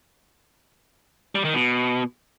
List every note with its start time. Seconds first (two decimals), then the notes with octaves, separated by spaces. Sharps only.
1.35 G3
1.45 D#3
1.54 B2